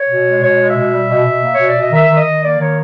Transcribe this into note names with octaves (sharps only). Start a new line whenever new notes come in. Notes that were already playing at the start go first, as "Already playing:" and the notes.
Already playing: C#5
B2
G#3
B2 C#5
G#3
E5
B2
G3
B2
B2
A#3
C#5
B2
D5
B2 D#5
D#3 E5
D#3
D#5
D#3
A#3 D5
D#3 C#5